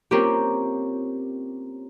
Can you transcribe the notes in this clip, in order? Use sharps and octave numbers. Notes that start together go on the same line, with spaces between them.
A#3 C4 C#4 F4 G4